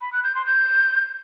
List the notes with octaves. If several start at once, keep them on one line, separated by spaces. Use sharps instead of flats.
B5
F#6
G6
C6
G6